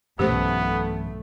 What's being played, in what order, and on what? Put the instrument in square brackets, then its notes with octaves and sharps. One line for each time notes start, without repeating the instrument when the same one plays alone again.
[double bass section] B1 A3 [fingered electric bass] G2 E3 C#4 [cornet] B3 [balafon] G4 C5